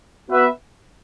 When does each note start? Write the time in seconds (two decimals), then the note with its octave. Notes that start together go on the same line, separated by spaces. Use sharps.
0.28 B3 F#4 B4 E5